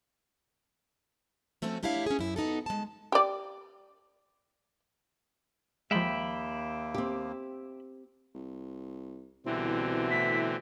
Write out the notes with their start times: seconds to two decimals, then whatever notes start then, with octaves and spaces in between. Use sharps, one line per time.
1.62 F3 A3 C4 C#4 F#4
1.83 A3 D4 E4 G4 C#5 F5
2.06 C#4 G#4
2.19 F#2 E4
2.36 B3 D#4 F#4 A4
2.66 G#3 A5
3.12 G4 D5
5.91 D#2 F3 G#3 A#3 E5 G5 B5
6.94 C4 G4
8.35 C2
9.46 C2 B2 D3 E3 C4 E4
10.11 A2 B6